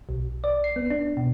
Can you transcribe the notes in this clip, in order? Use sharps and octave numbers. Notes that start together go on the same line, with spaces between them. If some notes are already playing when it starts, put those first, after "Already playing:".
B1
D5
C7
B3
D4
B2